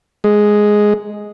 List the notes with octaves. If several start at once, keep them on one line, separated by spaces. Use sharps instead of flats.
G#3